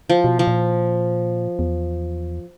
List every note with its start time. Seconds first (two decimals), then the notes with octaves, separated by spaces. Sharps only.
0.10 F3
0.24 B2
0.39 F3
0.47 A#2
1.59 E2